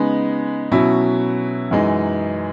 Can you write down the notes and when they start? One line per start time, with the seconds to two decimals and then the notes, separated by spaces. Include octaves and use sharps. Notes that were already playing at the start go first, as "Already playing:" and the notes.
Already playing: C#3 G#3 B3 D#4
0.72 B2 F#3 C#4 E4
1.71 F#2 E3 G#3 D#4